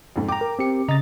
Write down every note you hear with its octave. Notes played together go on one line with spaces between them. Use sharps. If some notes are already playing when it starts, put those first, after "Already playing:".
F2 G#2
G5 A#5 D6
A#4
C4 G4 C#7
C#3 D#5 A#5 A6